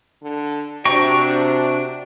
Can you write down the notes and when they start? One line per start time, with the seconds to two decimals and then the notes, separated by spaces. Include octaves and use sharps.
0.23 D3
0.85 C3 D4 F#4 G5 A#5 C#6